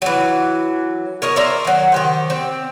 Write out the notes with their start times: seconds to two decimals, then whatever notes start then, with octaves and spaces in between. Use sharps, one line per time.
0.02 E3 F#3
1.22 A#4 C#5 D#5
1.36 A#4 C5 D5 E5
1.65 D#3 F#3
1.92 D#3 G4 C5
2.30 C4